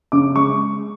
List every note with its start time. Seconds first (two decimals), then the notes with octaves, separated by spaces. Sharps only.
0.12 C#3 D6
0.35 G#3 C#6